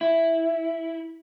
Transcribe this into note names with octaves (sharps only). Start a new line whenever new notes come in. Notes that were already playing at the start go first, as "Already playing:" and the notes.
E4